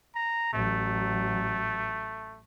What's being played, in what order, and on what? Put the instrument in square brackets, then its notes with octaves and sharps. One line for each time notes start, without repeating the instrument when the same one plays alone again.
[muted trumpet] A#5
[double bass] A1 F#3 [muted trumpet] A3